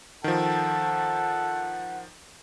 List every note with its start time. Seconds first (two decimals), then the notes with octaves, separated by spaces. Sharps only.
0.24 D#3 F3 A4 F#5